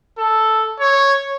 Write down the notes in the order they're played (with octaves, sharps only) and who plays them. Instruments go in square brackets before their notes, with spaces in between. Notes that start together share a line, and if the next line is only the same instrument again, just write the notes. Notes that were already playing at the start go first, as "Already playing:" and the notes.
[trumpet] A4
C#5